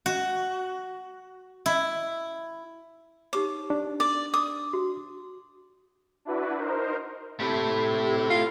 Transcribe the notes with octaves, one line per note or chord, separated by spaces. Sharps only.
F#4
E4
D#4 G4 C#5 D6
D4
D5 D6
D6 D#6
F#4
D4 E4 F#4 B4
D#4 A#4 C5
C3 A3 E4
F4